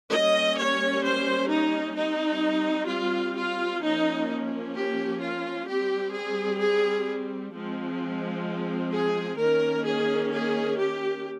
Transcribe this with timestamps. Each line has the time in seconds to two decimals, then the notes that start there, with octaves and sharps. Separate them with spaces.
0.10 G3 A#3 C#4 D#5
0.57 C#5
1.04 C5
1.49 D#4
1.95 G3 C4 D#4
2.89 F4
3.35 F4
3.81 F3 A#3 C#4 D#4
4.75 G4
5.21 F4
5.67 G3 C4 G4
6.14 G#4
6.60 G#4
7.53 F3 G#3 C4
8.92 G#4
9.38 D#3 A#3 C#4 A#4
9.84 G#4
10.31 G#4
10.77 G4